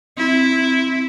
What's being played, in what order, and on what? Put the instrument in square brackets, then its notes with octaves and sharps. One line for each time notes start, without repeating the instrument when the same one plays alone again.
[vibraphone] C4 [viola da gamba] E4